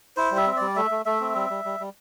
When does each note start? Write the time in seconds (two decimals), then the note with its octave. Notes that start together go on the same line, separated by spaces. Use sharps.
0.17 E4 C5
0.31 G3
0.37 E5
0.47 C4
0.56 G3 D5
0.76 A3 E5
0.91 A3
1.05 A3 E5
1.20 C4
1.35 G3
1.50 G3
1.65 G3
1.80 G3